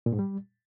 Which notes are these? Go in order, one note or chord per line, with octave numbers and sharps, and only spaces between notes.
A#2
G#2
G3